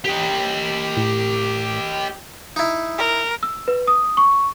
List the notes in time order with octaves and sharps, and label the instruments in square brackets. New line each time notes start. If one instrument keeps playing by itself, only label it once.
[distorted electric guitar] G4 D#5
[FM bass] A2
[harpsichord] D#4 E4
[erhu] A#4
[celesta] E6
B4
D#6
C#6